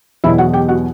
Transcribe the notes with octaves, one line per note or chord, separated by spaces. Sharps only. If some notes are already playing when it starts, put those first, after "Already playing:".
E2 B2 F#3 E4 E5
F#4 F#5
G4 G5
F#4 F#5